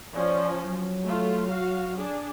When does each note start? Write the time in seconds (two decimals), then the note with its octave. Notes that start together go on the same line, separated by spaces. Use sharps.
0.14 F3 C#4 D5
0.63 F#3
1.05 A3 F4
1.48 F#4 F5
1.97 D4 G#4